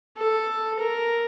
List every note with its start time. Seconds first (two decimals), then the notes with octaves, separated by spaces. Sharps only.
0.17 A4
0.80 A#4